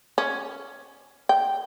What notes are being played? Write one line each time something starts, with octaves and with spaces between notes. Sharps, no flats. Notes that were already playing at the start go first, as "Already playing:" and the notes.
C#4
G5